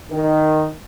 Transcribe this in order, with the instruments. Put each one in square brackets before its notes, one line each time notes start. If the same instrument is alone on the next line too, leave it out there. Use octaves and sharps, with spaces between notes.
[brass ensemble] D#3